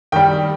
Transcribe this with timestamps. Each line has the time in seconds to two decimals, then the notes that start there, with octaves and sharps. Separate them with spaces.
0.12 D#3 G3 G5